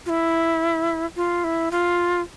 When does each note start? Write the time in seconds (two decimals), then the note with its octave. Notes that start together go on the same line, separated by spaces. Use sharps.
0.06 F4
0.09 E4
1.16 F4
1.44 E4
1.71 F4